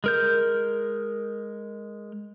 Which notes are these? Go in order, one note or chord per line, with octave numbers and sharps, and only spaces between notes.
G#3 A#4 G6